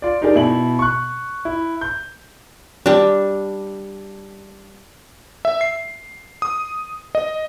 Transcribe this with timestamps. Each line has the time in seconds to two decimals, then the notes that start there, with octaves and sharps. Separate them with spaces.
0.02 F4 D5
0.21 D4 D#4 G4 G#4 A#4 D5
0.35 B2 E4 F#7
0.79 C#6 F#6
1.45 E4
1.81 G6
2.86 G3 D4
5.45 E5
5.61 C7
6.42 D#6
7.15 D#5